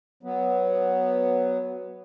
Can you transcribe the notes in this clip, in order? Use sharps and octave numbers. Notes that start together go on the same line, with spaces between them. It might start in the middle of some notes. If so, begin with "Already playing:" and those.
F#3 B3